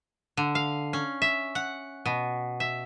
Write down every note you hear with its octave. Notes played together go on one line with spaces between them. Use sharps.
D3
F5
C#4
E5
F#5
B2
E5